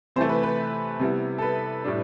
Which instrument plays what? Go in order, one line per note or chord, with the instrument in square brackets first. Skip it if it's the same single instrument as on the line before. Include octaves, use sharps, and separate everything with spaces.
[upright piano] C3 E3 A3 C5
B4
B4
C3 G3 B3 E4
A4
B4
A2 G3 D4